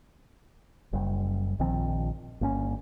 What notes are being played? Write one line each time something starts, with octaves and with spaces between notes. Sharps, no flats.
F#1 F#2 G3
A#1 D#3 F3 C4
G1 A#3 C4 C#4